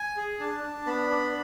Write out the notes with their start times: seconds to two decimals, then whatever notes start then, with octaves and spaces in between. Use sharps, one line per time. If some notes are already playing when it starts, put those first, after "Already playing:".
Already playing: G#5
0.17 G#4
0.40 D4 A5
0.63 D4
0.86 B3 B5
1.10 D4